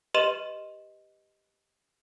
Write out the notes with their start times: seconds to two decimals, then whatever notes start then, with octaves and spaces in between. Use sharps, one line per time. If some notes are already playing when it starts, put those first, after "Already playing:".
0.14 G4 B4 D#5 C6 D#7 E7